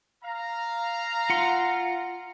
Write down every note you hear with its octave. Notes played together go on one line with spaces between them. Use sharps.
F5 A#5
F4 F#5 C6